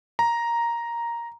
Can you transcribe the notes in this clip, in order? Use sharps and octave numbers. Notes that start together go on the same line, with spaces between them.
A#5